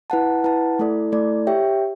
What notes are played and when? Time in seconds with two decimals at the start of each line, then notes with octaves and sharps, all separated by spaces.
0.10 E4 B4 F#5 A5
0.44 E4 B4 F#5 A5
0.79 A3 E4 A4 D5
1.12 A3 E4 A4 D5
1.47 G4 C#5 E5 G5